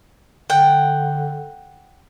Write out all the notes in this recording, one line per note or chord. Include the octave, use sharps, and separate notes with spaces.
D3 F#5 G5